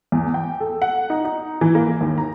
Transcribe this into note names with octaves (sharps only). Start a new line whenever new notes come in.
E2
G5
A4
F#5
D#4
D#4
E3
A#3
D#2
A#5